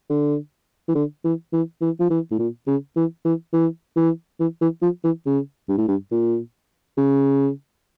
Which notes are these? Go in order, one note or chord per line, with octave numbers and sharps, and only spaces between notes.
D3
E3
D3
E3
E3
E3
F3
E3
A2
A#2
C#3
E3
E3
E3
E3
E3
E3
F3
E3
C#3
G2
A2
G2
A#2
C#3